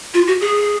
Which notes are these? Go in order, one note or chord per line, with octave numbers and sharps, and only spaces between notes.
F4
F#4
G#4